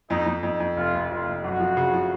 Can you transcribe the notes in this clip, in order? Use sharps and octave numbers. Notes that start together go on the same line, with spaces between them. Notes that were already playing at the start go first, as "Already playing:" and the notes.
F2 D#4
F2
F2 D#4
F2
F1 F4
F1
F1 F4
F1
F#2 F#4
F3
C#3
F3